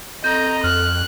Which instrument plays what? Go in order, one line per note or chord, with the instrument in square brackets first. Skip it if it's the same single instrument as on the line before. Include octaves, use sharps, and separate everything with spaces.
[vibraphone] C4 A4 [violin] D#5 A#5 [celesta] G6
[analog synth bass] F2 [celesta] F6 [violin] F#6